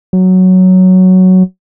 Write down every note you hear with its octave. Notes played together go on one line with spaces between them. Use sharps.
F#3